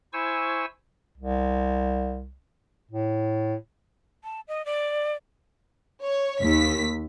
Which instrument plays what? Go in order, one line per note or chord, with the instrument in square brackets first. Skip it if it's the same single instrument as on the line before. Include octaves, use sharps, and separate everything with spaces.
[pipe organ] E4 C5 G#5 C#6 E6
[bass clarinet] C2
A2
[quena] A5
D#5
D5
[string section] C#5
D#2 B6